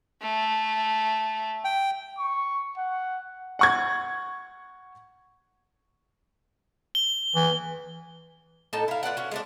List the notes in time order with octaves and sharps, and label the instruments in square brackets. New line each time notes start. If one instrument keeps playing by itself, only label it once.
[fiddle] A3
[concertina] G5
[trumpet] C#6
F#5
[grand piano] F#5 C#6 G#6
[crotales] G7
[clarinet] E3
[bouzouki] A2 D#4 A4 A5
E4 F5
F4 B4 D5 F#5
C#4 F#4
G#3 A3 D4